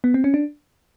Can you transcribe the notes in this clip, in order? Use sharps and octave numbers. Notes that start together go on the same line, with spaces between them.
B3
C4
C#4
D4